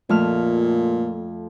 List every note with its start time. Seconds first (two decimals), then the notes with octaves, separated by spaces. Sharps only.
0.09 F2 A#2 A3 F6